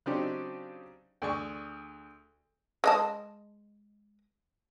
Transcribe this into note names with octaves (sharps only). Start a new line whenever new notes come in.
C#3 F#3 C4 D4 D#4 G4
D2 G#4 D5 C#6
G#3 D#5 A5